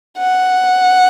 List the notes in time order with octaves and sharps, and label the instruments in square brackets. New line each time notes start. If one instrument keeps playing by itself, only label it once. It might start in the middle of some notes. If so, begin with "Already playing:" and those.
[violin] F#5